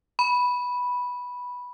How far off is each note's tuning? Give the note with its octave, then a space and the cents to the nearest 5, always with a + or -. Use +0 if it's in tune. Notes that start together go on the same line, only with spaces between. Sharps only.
B5 -5